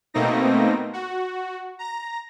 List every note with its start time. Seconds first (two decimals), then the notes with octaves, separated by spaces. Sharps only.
0.14 B2 A3 A#3 C4 D#4 A#6
0.93 F#4
1.79 A#5 A#6